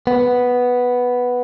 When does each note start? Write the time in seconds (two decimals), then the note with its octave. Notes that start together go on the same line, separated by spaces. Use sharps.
0.07 B3